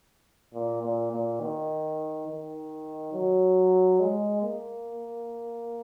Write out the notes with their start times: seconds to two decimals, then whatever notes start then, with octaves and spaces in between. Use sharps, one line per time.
0.54 A#2
0.82 A#2
1.12 A#2
1.40 D#3
2.27 D#3
3.13 F#3
4.00 G#3
4.43 A#3